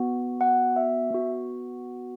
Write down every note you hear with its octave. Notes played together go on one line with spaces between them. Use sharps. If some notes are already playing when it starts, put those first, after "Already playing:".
Already playing: B3 F#4
F#5
E5
B3 F#4